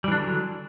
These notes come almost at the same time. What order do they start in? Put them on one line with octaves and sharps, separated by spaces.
G3 E3 D4 D3 F#3